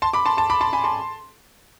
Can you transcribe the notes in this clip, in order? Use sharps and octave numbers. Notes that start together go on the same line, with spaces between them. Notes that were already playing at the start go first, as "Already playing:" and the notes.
A5 C6
B5 D6
A5 C6
A5 C6
B5 D6
A5 C6
G#5 B5
A5 C6